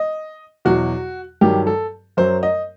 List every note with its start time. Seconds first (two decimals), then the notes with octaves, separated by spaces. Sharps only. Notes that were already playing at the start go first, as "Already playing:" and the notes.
Already playing: D#5
0.65 E2 B2 F#3 F#4
1.41 G2 D#3 F#3 G4
1.67 A4
2.17 F#2 F#3 C5
2.43 D#5